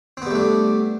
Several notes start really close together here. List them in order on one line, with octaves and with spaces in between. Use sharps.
C4 B3 G3 A3 D4